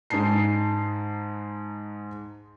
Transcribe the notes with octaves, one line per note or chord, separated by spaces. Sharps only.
G#2 G#3 D#4 A5 C7